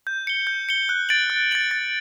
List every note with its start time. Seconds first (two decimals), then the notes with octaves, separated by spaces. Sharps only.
0.07 G6
0.27 C#7 G7
0.47 G6
0.69 C#7 G7
0.89 F#6
1.09 A6 D7 F#7
1.30 F#6
1.51 A6 D7 F#7
1.71 A6